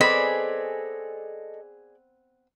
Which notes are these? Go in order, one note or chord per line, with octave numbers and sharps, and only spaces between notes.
B3 C4 G#4 A4 D5 D#5 B5